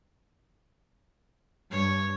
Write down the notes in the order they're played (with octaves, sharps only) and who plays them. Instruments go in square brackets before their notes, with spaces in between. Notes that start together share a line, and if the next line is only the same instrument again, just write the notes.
[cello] G2 [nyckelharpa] C#5